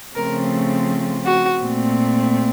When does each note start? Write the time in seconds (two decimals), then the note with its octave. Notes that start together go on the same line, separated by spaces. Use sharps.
0.15 C#3 F3 A3 C4 A#4
1.25 F#4
1.61 A#2 A3 C4